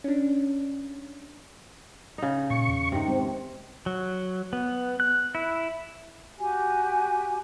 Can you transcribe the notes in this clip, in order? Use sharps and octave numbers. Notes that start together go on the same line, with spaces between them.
C#4 D4
C#3 D#4
A#2 C#6
E2
G2 C3 D#3 G#3
G#3 C4
F#3
B3
F#6
E4
F#4 G4 G#5